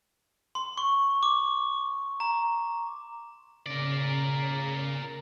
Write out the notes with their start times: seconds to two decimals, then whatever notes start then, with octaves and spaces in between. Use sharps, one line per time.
0.55 C6
0.78 C#6
1.23 D6
2.20 A#5
3.66 C#3 A#4 D5